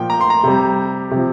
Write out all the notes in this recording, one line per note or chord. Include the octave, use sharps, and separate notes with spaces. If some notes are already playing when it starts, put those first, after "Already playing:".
Already playing: A#2 F3 G5
A#5
C6
A#5
C3 G3
C3 F3